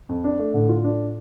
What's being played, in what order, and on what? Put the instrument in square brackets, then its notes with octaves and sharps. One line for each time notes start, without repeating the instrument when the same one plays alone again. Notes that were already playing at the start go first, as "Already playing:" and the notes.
[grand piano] F2
D4
A3
[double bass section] A2 [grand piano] D3
[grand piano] F4
D4